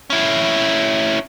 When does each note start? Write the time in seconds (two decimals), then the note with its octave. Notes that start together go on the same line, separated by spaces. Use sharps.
0.10 C#4 E4